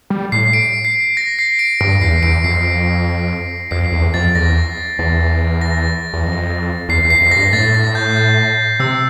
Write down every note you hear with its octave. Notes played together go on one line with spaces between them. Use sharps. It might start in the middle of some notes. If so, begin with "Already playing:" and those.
G3
A2 C7
D7
C7
A#6
C7
D7
G2 D7
E2 C7
E2 D7
F2 C7
F2 C7
E2
F2 A6
E2 A#6
E2
A#6
E2
F2
E2 C7
E2
C7
F2
G2 A#6
A2 A6
A#6
G6
G6
C3 E6